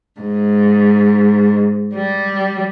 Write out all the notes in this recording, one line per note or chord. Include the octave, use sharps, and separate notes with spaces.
G#2
G3